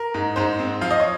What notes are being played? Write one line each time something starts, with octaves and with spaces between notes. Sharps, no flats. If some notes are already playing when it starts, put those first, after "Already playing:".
Already playing: A#4
G#2
G#2 C5
C4
F3 F5
D#5
C#5